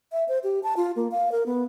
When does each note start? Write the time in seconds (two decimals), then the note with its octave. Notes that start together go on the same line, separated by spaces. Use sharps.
0.12 E5
0.28 C5
0.44 G4
0.63 A5
0.77 F4
0.96 A#3
1.11 F5
1.32 A#4
1.46 B3